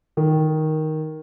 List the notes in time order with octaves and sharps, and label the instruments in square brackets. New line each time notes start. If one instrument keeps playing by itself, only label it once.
[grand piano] D#3